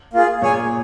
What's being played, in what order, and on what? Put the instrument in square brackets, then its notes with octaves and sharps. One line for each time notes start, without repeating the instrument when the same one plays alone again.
[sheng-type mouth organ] A#3 F4 G#4
[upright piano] A#2 [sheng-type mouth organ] G#4 C#5 G#5